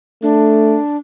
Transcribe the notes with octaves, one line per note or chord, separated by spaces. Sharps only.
A3 D4